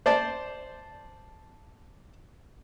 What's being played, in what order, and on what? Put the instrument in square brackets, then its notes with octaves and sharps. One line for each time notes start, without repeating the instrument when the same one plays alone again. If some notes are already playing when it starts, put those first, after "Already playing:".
[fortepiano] C5 D5 A5